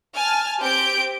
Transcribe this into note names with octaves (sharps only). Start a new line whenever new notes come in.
G#5 A5 F6
C4 G4 G6 D7